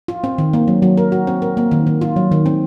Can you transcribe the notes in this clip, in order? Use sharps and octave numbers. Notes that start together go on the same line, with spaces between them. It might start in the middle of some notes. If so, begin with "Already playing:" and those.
F4
C4
D#3
A#3
F#3
F#3
A#4
F#4
C4
A#4
A#3
D#3
D#3
F4
F#3
D#3
C4